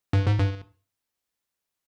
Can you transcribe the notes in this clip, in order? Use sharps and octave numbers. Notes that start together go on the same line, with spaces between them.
G2
G#2
G2